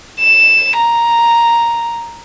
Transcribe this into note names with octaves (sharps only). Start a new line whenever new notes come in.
E7
A#5